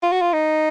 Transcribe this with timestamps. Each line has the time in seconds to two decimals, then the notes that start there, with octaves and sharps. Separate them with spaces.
0.03 F4
0.12 F#4
0.22 F4
0.33 D#4